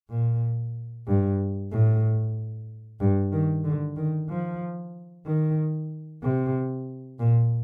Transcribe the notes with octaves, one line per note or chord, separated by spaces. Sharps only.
A#2
G2
A2
G2
D#3
D3
D#3
F3
D#3
C3
A#2